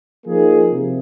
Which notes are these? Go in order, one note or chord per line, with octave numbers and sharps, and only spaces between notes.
F3 A#3 D#4 G#4
C3